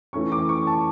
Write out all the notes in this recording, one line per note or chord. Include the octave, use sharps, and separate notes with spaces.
E3 A3 C#4 C#6
D6
C#6
A5